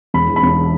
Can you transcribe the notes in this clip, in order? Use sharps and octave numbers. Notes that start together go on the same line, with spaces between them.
E1 B5
E2
B5
E1